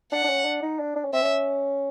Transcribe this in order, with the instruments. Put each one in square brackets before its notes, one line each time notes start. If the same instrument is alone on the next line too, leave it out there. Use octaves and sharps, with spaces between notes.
[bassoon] D4 [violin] F#5
[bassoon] D4
C#4
D4
D#4
D4
D4
C#4
[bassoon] C4 [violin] E5
[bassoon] C#4